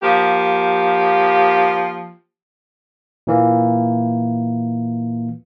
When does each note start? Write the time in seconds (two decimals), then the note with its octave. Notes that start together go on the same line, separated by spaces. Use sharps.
0.03 F3 A#3 G4
3.27 A#2 E3 A#3